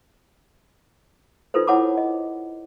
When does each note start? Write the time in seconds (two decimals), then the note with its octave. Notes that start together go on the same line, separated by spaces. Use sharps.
1.54 D#4 F4 A4 B4 C5
1.67 E4 C#5 F#5 A5 B5 D6
1.98 D#5